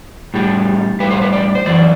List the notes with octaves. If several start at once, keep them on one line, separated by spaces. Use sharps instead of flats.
A2 G3
A2 G3 B4
C5
B4
D5
C5
F#2 E3 D5